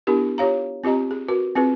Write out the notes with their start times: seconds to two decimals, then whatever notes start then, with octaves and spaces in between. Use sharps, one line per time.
0.07 B3 D4 E4 G4 A#4
0.38 F4 G4 C#5 F5 A#5
0.84 C4 F4 G4 D#5 A#5
1.11 G#4
1.28 F#4 A#4 B4
1.55 C4 F4 G#4 B4